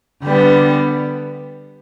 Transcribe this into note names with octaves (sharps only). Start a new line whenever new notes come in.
D3 G3 B3